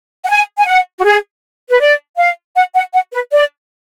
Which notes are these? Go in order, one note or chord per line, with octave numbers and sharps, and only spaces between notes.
F#5
G#5
G#5
F#5
F#4
G#4
B4
D5
F5
F#5
F#5
F#5
B4
D5